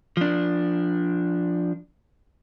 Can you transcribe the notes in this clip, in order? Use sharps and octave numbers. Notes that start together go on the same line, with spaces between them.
F3 D4